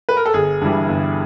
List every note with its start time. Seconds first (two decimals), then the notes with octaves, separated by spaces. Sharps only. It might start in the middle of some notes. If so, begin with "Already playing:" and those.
0.09 B4
0.17 A#4
0.26 A4
0.34 G1 G#4
0.62 G2 E3 G3
0.89 G1